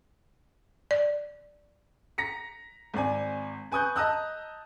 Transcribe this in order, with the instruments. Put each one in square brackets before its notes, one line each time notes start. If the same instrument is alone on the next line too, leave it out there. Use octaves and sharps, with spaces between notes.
[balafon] D5
[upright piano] A#5 A#6 B6 C#7
G#1 C4 D5 G#5
B4 G#5 C#6 D#6 F#6 G6
D#5 A5 A#5 D#6 E6 F#6